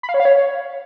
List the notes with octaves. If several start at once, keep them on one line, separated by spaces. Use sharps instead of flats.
B5
F5
C#5
F5
C#5